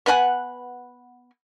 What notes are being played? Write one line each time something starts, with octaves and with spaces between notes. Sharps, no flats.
B3 B4 F#5 G#5